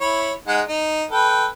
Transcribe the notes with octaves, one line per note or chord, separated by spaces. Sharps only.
E4 C#5 B5
G#3 D#4 F#5
D#4
A4 B4 G5